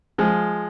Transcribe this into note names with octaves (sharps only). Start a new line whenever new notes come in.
F3 G#3